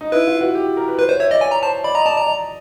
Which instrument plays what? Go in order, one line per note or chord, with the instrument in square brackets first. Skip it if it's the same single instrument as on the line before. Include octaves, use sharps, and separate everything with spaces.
[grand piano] D#4
[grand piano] E4 [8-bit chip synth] B4
[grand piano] F4
F#4
G4
A#4
B4
[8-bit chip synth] B4 [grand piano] C5
[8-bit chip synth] C5 [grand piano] C#5
[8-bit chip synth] C#5 [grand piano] E5
[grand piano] D5 [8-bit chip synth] D#5
[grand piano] C#5 [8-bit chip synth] G#5
[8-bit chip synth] A#5
[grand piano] C5 [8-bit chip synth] A5
[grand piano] D5 [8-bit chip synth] B5
[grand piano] D#5 [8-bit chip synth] A#5
[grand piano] D5 [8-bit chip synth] A5
[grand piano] D5 [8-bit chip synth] A#5
[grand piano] D5